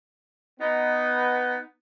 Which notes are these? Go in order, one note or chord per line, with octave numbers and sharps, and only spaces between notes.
B3 D#4